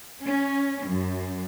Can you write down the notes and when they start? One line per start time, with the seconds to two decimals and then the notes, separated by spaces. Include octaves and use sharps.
0.24 C#4
0.86 F#2